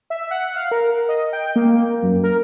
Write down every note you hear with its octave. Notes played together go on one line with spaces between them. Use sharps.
E5
F#5
F5
A#4
D#5
G5
A#3
F#2
A#4